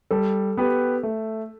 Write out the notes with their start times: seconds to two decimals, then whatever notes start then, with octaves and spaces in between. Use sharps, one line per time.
0.11 G3 A4
0.57 B3 G4 B4
1.03 A3